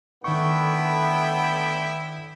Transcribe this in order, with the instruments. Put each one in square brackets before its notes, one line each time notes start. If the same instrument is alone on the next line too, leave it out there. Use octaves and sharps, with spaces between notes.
[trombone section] A2 D3 B3 [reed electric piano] D#3 C#6 [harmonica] E4 G5